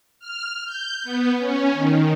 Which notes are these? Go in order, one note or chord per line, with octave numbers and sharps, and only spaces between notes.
F6
G6
B3
C#4
D#3